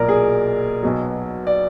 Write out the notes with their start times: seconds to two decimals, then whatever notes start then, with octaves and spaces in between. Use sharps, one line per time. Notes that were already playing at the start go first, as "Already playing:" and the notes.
Already playing: B1 A#2 F#3 A#4 D5
0.09 G#4
0.83 B1 B2 F#3
1.47 D5